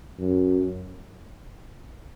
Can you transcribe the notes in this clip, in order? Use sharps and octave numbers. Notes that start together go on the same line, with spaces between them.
F#2